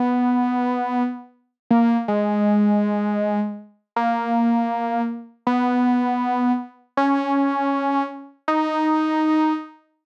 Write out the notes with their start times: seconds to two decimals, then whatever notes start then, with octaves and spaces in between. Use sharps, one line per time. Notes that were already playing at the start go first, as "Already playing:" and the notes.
Already playing: B3
1.71 A#3
2.08 G#3
3.96 A#3
5.47 B3
6.97 C#4
8.48 D#4